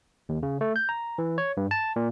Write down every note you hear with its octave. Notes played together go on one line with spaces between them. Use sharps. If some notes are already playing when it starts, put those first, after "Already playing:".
D#2
C#3
A3
G6
A#5
E3
C#5
G2
A5
A#2